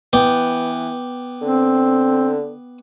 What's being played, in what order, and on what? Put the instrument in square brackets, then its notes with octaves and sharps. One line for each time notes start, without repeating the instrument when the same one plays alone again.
[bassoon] E3 [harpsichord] B3 D5 G5
[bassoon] D3 [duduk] C4